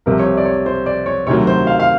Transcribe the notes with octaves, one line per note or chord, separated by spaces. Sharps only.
C2 C3 F3 A#4
C#5
C5
D5
C#5
C5
D5
C#5
D2 C3 D#3 F#3 C#5
C5
F5
F5